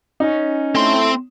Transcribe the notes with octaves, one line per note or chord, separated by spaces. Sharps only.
C#4 D#4
A3 C4 E4 C6